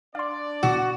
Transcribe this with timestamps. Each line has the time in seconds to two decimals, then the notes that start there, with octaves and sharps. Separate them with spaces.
0.15 D4 D5 F5 C6
0.63 B2 F#4 E6